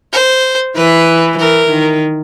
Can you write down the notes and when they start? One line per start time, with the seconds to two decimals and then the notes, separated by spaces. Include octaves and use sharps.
0.13 C5
0.76 E3 B4
1.39 E3 A#4
1.70 D#3